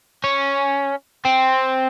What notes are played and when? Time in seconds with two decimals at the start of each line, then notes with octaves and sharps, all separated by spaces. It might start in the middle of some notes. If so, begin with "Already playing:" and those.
0.24 C#4
1.25 C4